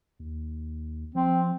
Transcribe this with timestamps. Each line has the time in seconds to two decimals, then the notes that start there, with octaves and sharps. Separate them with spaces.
0.20 D#2
1.15 F3 C4